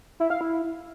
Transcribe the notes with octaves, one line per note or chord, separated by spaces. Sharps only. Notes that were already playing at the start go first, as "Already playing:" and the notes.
E4
F5
E4